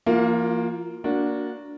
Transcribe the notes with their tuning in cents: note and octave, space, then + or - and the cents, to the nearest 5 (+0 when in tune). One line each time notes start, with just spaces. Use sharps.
F3 -45 A#3 +0 F4 +30
A#3 +0 D4 -15 F#4 -15